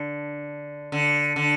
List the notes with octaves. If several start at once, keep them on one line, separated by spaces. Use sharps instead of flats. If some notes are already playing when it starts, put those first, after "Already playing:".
Already playing: D3
D3
D3